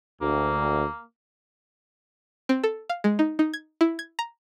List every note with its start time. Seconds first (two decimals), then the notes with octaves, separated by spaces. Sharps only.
0.22 D2 A#3
2.49 C4
2.64 A4
2.89 F5
3.04 G#3
3.19 D#4
3.39 D#4
3.54 G#6
3.81 E4
3.99 G#6
4.19 A#5